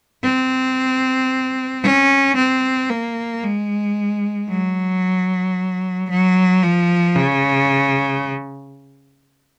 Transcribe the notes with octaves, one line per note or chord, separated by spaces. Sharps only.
C4
C#4
C4
A#3
G#3
F#3
F#3
F3
C#3